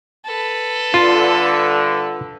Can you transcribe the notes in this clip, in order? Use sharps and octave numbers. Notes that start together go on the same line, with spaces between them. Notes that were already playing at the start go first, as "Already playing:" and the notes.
A4 B4
G2 D3 F4